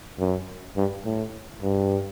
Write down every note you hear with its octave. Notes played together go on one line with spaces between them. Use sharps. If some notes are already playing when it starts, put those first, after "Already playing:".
F#2
G2
A2
G2